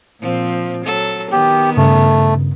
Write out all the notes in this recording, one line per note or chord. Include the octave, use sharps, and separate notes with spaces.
A#2 F3 C4
F#3 A4
D#3 B3 G4
G2 C#3 A3